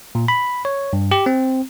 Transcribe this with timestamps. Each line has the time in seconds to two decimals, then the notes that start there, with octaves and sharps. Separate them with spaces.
0.15 A#2
0.28 B5
0.65 C#5
0.93 G2
1.11 G4
1.26 C4